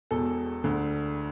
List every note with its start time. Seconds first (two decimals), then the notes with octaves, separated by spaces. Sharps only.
0.11 E1 E2 B2 A4
0.64 D2 D3